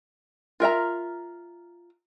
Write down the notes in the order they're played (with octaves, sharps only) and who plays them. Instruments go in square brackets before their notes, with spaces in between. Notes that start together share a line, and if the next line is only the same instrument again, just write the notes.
[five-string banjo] F4 A#4 E5 A#5